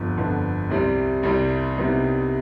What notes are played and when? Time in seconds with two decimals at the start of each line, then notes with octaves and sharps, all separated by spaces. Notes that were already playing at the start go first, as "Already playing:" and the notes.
Already playing: G1 F2 D3 F3 B3
0.16 G1 F2 D3 F3 B3
0.70 C2 C3 G3
1.23 C2 C3 G3
1.77 C2 C3 G3 B3 D#4